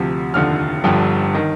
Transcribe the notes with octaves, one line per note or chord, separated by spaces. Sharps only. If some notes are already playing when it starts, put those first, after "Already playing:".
Already playing: D2 C3 F3
F1 D#2 D3 F3 F6
G1 G2 D3 F3 G5
D#3